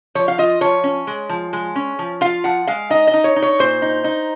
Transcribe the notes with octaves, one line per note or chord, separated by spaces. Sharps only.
F3 C#5
F5
F4 D#5
F3 C#5
C#4
G#3
F3
G#3
C#4
F3
F4 F5
F3 F#5
G#3 F5
D#4 D#5
D#5
D#4
C#5
D#4
C#5
A#2 C5
D#4
D#4